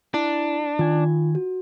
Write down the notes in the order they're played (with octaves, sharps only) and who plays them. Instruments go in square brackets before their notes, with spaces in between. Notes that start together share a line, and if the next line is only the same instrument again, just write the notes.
[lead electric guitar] D4 [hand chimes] E4
[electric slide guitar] D#3 G#5 [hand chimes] F4
[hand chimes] F#4